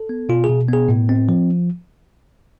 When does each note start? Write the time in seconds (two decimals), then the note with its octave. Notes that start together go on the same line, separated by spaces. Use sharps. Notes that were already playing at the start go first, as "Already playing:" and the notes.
Already playing: A4
0.09 B3
0.29 B2 F4
0.44 G#4
0.49 B2
0.69 B3 G#4
0.88 A2
1.09 C4
1.29 F3